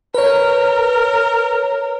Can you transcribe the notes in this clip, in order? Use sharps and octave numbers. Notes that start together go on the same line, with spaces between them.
A#4 B4 C#5